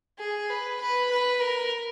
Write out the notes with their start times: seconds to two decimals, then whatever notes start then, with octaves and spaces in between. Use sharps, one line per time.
0.19 G#4
0.50 B4
0.81 B4
1.11 B4
1.42 A#4